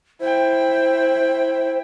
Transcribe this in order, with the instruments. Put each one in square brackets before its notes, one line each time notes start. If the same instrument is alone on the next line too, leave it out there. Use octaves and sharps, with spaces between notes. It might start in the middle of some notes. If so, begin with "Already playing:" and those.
[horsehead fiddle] E4 G5 [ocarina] C5